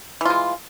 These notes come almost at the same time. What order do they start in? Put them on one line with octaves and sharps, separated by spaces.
E3 F4 G#3